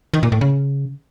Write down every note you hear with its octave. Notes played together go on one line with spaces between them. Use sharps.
D#3
A#2
A2
C#3